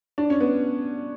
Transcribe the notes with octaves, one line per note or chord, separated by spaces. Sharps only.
D4
C#4
B3